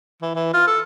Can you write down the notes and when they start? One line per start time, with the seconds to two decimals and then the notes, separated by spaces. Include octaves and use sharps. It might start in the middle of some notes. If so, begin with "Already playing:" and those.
0.22 E3
0.35 E3
0.54 F4
0.67 A4